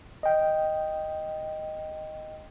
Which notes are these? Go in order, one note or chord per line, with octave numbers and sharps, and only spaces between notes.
D#5 G5